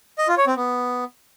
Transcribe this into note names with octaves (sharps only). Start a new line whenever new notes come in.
D#5
F4
C#5
C4
B3